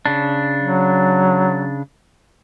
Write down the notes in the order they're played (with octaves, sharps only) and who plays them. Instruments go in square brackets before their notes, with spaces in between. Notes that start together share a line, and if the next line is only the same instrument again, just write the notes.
[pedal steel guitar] C#3 D4
[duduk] F#3